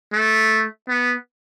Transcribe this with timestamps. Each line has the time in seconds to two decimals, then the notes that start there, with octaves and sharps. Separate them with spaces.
0.13 A3
0.89 B3